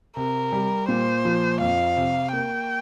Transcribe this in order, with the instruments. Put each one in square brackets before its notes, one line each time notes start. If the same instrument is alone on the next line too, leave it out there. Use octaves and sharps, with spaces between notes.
[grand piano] C3 [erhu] A#4
[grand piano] G3
[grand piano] A#2 [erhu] C5
[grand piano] F3
[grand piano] F2 [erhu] F5
[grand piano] C3
[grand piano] A#3 [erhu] G5